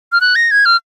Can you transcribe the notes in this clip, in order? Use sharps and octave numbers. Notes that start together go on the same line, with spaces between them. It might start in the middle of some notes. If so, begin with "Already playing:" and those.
F6
F#6
A#6
G#6
F6